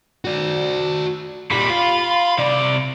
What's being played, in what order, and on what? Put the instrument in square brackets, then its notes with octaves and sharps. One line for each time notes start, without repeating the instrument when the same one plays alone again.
[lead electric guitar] F#4 D5
[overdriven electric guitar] A#2 G3 [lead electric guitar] B5
[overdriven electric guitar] F4
C3 D5